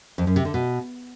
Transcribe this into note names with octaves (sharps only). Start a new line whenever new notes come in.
F2
F#2
C3
D3
B2